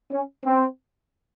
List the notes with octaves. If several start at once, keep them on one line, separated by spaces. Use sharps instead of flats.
C#4
C4